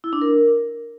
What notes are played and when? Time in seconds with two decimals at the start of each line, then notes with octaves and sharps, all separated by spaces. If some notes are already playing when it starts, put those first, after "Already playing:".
0.04 E4
0.13 D4
0.22 A#4